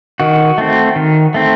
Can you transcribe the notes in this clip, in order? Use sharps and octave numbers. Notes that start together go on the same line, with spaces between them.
D#3 F#4
A3 C4
D#3
A3 C4